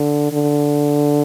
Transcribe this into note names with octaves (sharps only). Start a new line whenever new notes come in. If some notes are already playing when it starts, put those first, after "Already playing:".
Already playing: D3
D3